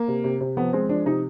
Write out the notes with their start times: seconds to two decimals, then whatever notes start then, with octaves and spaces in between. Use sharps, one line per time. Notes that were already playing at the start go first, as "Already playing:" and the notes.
Already playing: A#3
0.08 C3
0.24 C3
0.41 C3
0.57 F3 B3
0.73 G#3 C4
0.89 F3 D4
1.06 C3 D#4